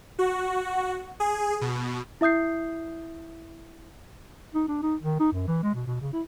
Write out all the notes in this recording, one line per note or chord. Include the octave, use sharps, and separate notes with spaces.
F#4
G#4
B2
E4 E5 D#6 G6 C7
D#4
D4
D#4
D#3
D#4
F#2
E3
G#3
B2
B2
C#3
E4